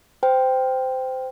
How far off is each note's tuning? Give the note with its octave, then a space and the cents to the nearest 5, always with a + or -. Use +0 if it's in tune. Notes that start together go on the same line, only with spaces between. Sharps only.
C5 -20 G5 +0